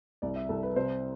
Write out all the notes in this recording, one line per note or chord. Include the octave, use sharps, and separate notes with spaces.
C2 D5
E5
C2 A4
B4
C3 C5